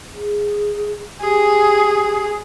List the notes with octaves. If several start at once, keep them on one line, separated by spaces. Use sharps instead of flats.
G#4
G4 G#4